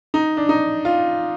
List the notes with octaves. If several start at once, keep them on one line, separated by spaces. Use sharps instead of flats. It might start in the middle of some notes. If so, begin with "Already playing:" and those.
D#4
D4
D#4
F4